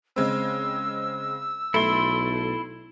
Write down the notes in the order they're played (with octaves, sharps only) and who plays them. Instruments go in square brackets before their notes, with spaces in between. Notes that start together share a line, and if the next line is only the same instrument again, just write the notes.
[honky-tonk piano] C#3 G#3 C4 [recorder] E6
[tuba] B1 [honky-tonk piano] A3 [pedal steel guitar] E4 C6